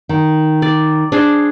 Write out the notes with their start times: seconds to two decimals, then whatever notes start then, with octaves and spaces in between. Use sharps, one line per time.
0.09 D#3
0.62 D5
1.12 D4 G#4 C5